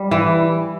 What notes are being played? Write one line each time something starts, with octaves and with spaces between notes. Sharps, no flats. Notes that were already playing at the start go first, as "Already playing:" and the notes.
Already playing: G3
E3